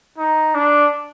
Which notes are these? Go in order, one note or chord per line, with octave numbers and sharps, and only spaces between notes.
D#4
D4